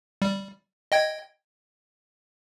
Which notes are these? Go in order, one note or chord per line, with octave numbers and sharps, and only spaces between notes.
G3
D#5 G5 G#6